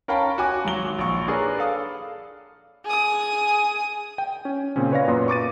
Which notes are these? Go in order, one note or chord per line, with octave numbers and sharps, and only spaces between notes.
C#4 A#4 F5 G5 A5 B5
F#4 G#5 D6
G#1 F#3 G7
A#1 C#6
D4 G#4 A#4 B4 C#5
A4 F5 D#6
G#4 D#6
G5
C#4
A#2 C#3 C4 C#4
B4 C#5 D5 F5 A#6
F#2 A#2 B3 C6
C#6 D6 A6 D#7